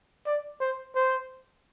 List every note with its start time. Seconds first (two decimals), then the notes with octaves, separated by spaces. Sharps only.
0.26 D5
0.60 C5
0.95 C5